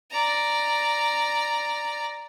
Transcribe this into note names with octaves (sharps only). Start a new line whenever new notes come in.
D5 A#5